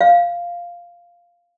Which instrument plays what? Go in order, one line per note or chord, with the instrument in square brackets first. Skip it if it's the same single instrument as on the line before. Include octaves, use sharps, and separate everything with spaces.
[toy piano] F5